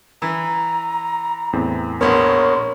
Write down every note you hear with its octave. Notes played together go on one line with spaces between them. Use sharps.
E3 A#5
E2 A2 C4
A#1 B3 A#4 C#5 C6